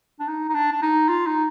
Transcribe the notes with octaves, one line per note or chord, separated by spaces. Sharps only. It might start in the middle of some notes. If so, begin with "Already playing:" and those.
D4
D#4
D#4
D4
D4
D#4
F4
D#4